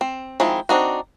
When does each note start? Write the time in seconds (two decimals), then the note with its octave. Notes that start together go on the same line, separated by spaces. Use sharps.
0.01 C4
0.40 D#3 F3 G#3 C4 E4
0.69 C4 D4 D#4 F#4